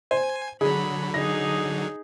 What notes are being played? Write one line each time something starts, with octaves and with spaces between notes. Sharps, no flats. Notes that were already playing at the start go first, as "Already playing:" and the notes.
C5 G#5
D3 F#3 G#4 B5
D#4 G#4 A#6